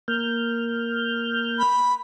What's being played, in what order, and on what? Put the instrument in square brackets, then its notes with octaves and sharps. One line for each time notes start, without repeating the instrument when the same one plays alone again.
[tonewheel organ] A#3 F6 G6
[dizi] B5